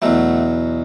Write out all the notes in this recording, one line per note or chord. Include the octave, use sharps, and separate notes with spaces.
E2 B2 F#3 A3